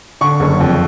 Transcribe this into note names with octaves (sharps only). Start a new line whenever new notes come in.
D3 C#6
F#1
F2